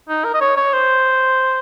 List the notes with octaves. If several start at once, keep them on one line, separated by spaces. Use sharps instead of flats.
D#4
A#4
D#5
C#5
C#5
C5